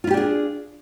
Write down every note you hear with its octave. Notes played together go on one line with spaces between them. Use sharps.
D4 E4 F4 G4 G#4